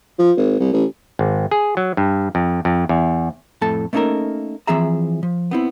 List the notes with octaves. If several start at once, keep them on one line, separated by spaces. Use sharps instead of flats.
F3
G#1
C2
A1
G#1
G#4
F#3
G2
F2
F2
E2
F2 A2 A3 A4 A5
A3 A#3 C#4 D#4 A4 A#4
E3 F3 C4 G#4 E5 A#5
F3
B3 C4 E4